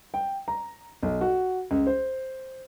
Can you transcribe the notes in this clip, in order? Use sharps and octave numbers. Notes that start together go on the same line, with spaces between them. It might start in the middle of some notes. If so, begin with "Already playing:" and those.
G5
A#5
B1
F#4
C#2
C5